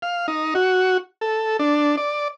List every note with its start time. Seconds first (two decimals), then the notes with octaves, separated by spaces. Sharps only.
0.02 F5
0.28 D#4
0.55 F#4
1.21 A4
1.59 D4
1.97 D5